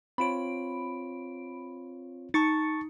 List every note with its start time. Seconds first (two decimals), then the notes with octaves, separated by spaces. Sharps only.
0.18 C4 F4 C#5 B5 D7
2.34 D#4 A5 C#6 A6 C#7